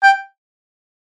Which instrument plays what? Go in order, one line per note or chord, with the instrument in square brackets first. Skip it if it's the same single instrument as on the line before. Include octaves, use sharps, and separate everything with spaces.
[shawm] G5